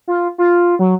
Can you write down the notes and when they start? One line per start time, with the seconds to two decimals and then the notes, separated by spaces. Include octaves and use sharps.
0.08 F4
0.38 F4
0.79 F#3